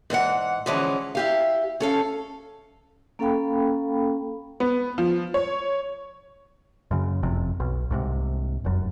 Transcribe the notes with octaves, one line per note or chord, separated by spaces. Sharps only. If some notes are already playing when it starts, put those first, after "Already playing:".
G#2 E3 C5 F#5
D3 E3 F3 G#3 C#4
E4 G4 F5
C#4 A4 F5
A#3 C#4 A4 F5 G5 B5
B3
F3
C#5
F#2 C#3
F#1 F2 C3
B1
C2 G#2 C3
F1 F#2